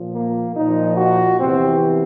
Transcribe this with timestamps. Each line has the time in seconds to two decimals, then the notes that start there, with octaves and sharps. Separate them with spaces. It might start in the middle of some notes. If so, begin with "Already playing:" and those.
Already playing: A#2 F3
0.13 A#3
0.56 A#2 F3 D#4
0.97 F#4
1.40 E2 C3 E3 C4